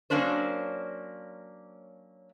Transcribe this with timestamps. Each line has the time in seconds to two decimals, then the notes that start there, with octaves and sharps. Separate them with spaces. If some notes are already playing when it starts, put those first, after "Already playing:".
0.10 F#3 A#3 C#4 D4 C5